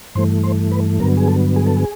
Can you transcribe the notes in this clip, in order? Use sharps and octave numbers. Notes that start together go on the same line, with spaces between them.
G2 E3 A3 C5
C5
B4
G2 D3 F#3 B3 A#4
G#4
A4
G#4
A4
G#4